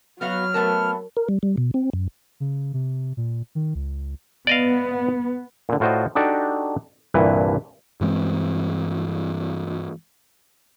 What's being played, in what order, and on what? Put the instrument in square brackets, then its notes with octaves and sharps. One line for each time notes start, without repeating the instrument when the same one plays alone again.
[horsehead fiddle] F#3 [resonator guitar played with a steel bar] B3 F#4 F5 [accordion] F6
[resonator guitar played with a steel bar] A3 B3 A5 [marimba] A#4
[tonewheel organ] A#4
G3
G3
B2
C4
F#2
[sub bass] C#3
C3
A#2
D#3
C#2
[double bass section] B3 [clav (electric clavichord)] D5 D#5 F5
[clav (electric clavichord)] A#2 D3
A2 F4 F#4 C5 D5 D#5
D4 D#4 F#4 G4 A4 D5
C2 G2 A#2 D3 E3 B4
[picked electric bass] G2 E3 G#3 C4